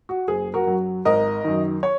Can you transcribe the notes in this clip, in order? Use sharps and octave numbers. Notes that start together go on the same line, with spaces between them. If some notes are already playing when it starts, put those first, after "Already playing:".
F#4
F#1 G#4
F#4 A#4
F#2 F#3
G#1 A#4 D#5
F#2 D#3
C#5